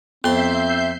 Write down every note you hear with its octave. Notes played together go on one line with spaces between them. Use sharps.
F2 B3 C4 E5 C6 G6 C7